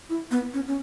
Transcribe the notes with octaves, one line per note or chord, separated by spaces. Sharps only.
E4
B3
C#4
C#4